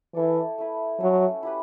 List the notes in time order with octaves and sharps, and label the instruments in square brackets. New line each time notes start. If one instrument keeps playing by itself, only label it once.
[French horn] E3 [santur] E4 A4 D5
[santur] A3 E4 B4
[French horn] F#3 [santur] A3 C#4 F#4
[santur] E4 G4 B4